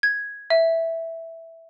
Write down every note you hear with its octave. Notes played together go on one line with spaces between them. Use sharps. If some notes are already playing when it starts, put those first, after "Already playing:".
G#6
E5